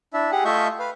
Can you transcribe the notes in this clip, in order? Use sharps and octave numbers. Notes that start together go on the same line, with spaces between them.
D4 E4 E5
G4 G#4 F#5
A3 F4 D#5 E5 C#6 G6
B4 F5